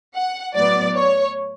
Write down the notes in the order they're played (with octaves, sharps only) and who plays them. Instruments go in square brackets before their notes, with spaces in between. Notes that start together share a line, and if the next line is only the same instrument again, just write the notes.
[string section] F#5
A2 F#3 B3 D5
C#5